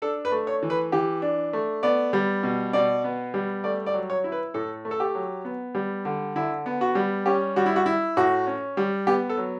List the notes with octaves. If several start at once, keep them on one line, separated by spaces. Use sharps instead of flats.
D4 A4
B4
A3
C#5
E3
B4
E3 G4
D4
A3
B3 D5
G3
B2
B2 D5
B3
G3
A3 D5
D5
F#3
C#5
E4
B4
A2 A4
A3
A4
G4
F#3
B3
G3
D3
D3 E4
B3
F#4
G3
C#4 G4
G3 F#4
E4
F#4
E4
A2 F#4
C#4
G3
B3 G4
A4
F#3